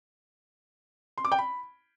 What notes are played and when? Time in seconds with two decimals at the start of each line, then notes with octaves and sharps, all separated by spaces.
1.18 C6
1.25 D6
1.32 G5
1.39 B5